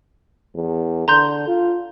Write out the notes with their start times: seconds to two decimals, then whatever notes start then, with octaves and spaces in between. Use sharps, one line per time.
0.55 E2
1.08 D3 A#5 C6 G6
1.47 F4